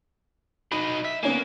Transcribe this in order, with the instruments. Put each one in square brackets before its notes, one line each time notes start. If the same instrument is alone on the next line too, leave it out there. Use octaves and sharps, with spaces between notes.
[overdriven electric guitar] F#3 D#4 [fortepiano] B5
[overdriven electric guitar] E5
[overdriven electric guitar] A#3 [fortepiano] B3 C#4 G#5